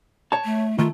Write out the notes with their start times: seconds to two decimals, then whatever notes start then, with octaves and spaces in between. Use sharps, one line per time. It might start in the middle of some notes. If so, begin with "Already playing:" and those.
0.32 C#5 A5
0.45 A3
0.78 D#3 A3 F4